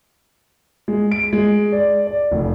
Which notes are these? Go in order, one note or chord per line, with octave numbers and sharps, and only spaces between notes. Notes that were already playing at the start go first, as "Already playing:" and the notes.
G#3
D7
G#3
D5
D5
F1